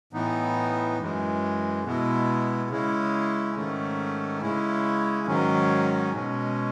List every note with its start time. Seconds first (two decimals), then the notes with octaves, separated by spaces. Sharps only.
0.13 A2 E3 B3 D#4
0.99 F#2 E3 G#3
1.84 B2 G#3 B3 E4
2.70 C#3 G#3 C#4 E4
3.56 G#2 D#3 A3 C#4
4.41 C#3 G#3 C#4 E4
5.27 G#2 D#3 F#3 C#4
6.13 B2 G#3 C#4